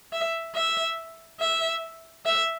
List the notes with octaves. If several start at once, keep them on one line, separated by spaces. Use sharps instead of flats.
E5
E5
E5
E5